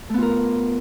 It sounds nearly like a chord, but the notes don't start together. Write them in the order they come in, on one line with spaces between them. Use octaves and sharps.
A3 B3 F4 A#4